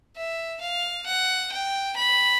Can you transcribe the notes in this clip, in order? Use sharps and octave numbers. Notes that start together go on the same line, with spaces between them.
E5
F5
F#5
G5
B5